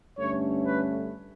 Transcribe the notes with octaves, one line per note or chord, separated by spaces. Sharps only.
G2 D3 A3 C#4 C#5
B4